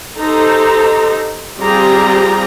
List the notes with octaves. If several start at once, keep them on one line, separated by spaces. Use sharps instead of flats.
D#4 G4 A4 C5 A#5
G3 C4 F4 G4 G#4 A#5